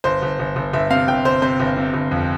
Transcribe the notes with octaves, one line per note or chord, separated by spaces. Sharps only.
G1 C5
G1
G1
G1
G1 E5
C3 F5
G1 G5
G1 C5
C3 C5
G1
C3
G1
F2